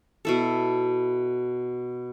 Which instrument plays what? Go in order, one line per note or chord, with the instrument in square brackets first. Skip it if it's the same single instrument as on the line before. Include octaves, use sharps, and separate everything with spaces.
[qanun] B2 E4 A4